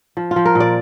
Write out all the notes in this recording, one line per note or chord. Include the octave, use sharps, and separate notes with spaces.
F3
F4
F3
A#4
A#2
D5